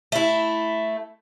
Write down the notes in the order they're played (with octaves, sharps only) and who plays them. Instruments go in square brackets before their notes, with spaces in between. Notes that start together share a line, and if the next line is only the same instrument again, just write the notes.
[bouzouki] A3 E4